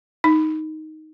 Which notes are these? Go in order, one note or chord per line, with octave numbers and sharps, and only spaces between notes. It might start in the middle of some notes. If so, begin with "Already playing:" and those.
D#4